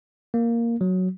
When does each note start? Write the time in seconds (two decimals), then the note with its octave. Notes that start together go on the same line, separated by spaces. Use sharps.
0.34 A#3
0.81 F#3